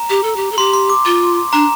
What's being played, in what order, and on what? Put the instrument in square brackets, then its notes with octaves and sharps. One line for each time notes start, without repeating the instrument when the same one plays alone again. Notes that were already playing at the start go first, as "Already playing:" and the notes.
Already playing: [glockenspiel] A#5
[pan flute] G4
A4
G4
A4
[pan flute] G4 [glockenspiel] C6
[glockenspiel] C6
D6
[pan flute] F4
[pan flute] D4 [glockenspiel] A#5